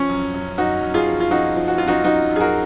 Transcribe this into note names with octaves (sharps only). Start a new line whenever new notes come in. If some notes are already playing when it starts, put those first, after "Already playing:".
Already playing: F3 C#4
F#2
F#2
F#2 D#4 F#4
F#2
F4 G#4
F3
F4
F3 D#4 F#4
F3
F#4
F#2 F4
D#4 F#4
F#2 D#4 F#4
F#2
G#4
F#4 A#4